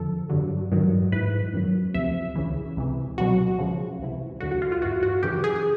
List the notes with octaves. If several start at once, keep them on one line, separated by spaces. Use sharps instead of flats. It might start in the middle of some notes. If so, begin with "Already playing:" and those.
Already playing: F2 D3 F3 A4
G2 D3 F#3
G2 D#3 F#3
G#2 E3 B4
F#2 D#3 F#3
D2 C3 F3 E5
C#2 C#3 E3
C#2 C3 E3
C2 B2 F#3 F#4
C#2 C#3 F3
C#2 C3 E3
D2 D3 F#3 F#4
F#4
F4
F4
G2 E3 F#4
F#4
F#2 C#3 E3 G4
G#4